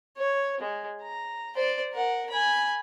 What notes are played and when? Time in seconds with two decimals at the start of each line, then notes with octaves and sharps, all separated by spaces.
0.17 C#5
0.60 G#3
1.02 A#5
1.55 C5 D5
1.93 A#4 F#5
2.30 G#5 B5